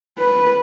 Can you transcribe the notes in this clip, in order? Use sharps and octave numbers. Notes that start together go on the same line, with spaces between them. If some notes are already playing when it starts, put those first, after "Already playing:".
B4